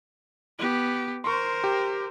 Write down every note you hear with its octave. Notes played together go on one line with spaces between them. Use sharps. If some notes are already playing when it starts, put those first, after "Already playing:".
B3 G4
A#4 C5 C6 C#6
G4